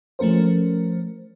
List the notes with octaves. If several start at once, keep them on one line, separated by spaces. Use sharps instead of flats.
F3 A3 C#4 A#4 C5